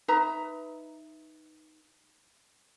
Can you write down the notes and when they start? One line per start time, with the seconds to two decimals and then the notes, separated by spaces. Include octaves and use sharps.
0.08 D#4 B4 E5 A#5